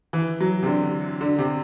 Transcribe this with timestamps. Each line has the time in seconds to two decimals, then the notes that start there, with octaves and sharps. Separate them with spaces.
0.13 E3
0.40 F#3
0.63 C3
0.66 D3
1.21 D3
1.38 C3